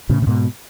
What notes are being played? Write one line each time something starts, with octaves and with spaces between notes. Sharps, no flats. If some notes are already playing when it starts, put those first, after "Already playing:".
A2 C#3
C#3
G#2 B2